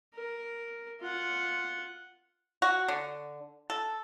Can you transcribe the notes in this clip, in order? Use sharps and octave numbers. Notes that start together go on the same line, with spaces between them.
A#4
F4 F#5
F#4
D3
A4